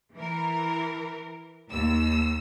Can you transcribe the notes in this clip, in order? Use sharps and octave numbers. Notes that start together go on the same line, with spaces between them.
E3 A#4
D#2 E6